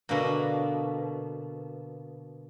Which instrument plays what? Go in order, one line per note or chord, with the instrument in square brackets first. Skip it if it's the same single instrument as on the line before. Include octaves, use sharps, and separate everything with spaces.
[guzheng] B2 D3 A#3